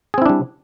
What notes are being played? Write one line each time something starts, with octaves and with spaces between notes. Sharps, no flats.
G3 C4 D4 E4 G#4